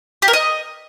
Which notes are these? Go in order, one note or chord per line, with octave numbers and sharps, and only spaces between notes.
G4
A#4
D#5